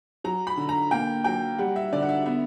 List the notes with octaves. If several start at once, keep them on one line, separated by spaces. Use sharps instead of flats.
F#3 A#5
B5
D3
A#5
A#3 G5
F#3 G5
G3 F#5
E5
D3 D5
F#5
E5
B3 E5